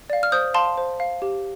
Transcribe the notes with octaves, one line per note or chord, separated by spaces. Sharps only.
D5 F5
F6
C5 D#6 G6
F5 A5 C6
C5
F5
G4